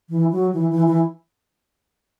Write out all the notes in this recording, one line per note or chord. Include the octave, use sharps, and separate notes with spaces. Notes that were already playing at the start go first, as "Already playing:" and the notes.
E3
F#3
E3
E3
E3